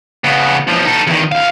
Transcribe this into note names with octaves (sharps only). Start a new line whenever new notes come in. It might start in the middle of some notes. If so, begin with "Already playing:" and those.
C#3 B3
B1 F3
D#4 A4
E2 D#3
D2 F5